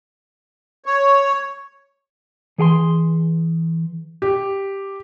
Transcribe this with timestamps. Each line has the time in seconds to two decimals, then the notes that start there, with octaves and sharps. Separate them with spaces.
0.86 C#5
2.58 E3 G#4 G5 C6
4.22 G4